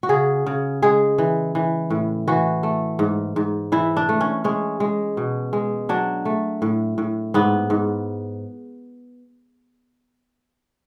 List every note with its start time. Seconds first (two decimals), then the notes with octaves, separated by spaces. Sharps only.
0.03 F#4
0.09 C#3 G#4
0.46 C#3
0.82 G#3 G#4
1.18 E3
1.55 E3
1.90 A2
2.28 E3 F#4
2.63 A3
2.99 G#2
3.36 G#2
3.72 E3 E4
3.97 D4
4.09 A3
4.21 C#4
4.44 G#3 C#4
4.80 G#3
5.17 B2
5.53 G#3
5.89 F#3 D4
6.25 A3
6.62 A2
6.98 A2
7.34 G#2 B3
7.70 G#2